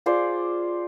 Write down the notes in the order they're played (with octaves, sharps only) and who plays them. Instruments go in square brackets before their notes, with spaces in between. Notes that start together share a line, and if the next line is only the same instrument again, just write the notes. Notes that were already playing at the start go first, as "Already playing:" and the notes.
[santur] F4 G#4 C5 D5